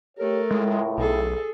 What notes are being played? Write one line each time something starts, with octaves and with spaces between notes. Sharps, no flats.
A3 G4 A4 A#4 C#5
C#2 A2 G#3
B1 G#4 A4